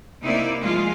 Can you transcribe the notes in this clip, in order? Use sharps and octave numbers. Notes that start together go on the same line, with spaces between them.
C3 A#3 D#4 E4 D5
F3 G#3 F4 G#4